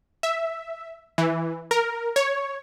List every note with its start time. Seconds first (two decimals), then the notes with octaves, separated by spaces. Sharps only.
0.23 E5
1.18 E3
1.71 A#4
2.16 C#5